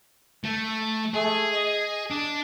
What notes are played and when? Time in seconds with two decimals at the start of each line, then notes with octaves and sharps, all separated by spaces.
0.44 A3
1.14 A3 G#4
1.53 D#5
2.10 D4